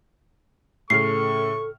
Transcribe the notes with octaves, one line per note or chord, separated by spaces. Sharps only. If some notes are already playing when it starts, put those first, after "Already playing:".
A2 C#3 A4 C#6 F6 C7